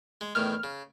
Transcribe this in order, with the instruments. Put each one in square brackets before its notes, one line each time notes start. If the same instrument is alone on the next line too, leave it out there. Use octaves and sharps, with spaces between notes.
[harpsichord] G#3
[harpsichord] E2 A2 D#3 [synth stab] F6
[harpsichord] C#3